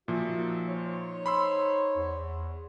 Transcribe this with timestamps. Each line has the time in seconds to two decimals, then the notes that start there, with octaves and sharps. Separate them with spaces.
0.08 A#2 F3 D#4 F#4 E5
0.68 D#4 C5 C#5
1.26 B5 C6 E6
1.96 E2